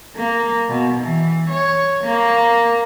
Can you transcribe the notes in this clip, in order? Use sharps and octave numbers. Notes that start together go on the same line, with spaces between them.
A#3
B2
E3
C#5
A#3